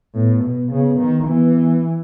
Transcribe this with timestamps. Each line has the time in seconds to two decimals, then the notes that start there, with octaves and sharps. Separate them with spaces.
0.15 A2 B3
0.44 B2
0.72 C#3 B3
1.00 D#3
1.28 E3 B3